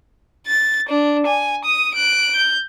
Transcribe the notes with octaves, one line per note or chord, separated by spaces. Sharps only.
A6
D4
G#5
D#6 D#7
F#6 D7
G6